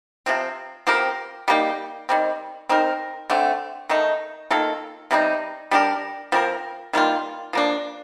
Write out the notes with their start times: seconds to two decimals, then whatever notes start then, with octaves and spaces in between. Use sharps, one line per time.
0.26 C3 F3 C4
0.87 F3 C4 G4 A#4
1.48 G3 A#3 D#4 G4
2.09 D#3 G3 C4
2.69 C4 D#4 A#4
3.30 D3 A3 C4
3.89 D#3 A3 D#4
4.50 D#3 A#3 F4 A4
5.11 C3 G3 C4 D#4
5.71 G3 D4 G4 A#4
6.32 F3 C4 G4 A#4
6.93 D#3 G3 A#3 F4
7.53 F3 A#3 D4